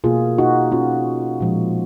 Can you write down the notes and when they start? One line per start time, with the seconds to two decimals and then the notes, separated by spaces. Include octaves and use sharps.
0.04 B2 A#3 F4 G#4
0.38 D#4 F#4
0.72 C#4 F4
1.40 A#2 F3 G#3